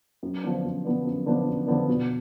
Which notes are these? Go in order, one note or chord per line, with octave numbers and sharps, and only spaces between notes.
F#2
D3 F3 B3 D4
F#2
D3 F3 B3 D4
F#2
D3 F3 B3 D4
F#2
D3 F3 B3 D4
B2